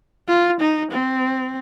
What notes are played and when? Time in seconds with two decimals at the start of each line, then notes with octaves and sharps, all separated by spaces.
0.28 F4
0.61 D#4
0.91 C4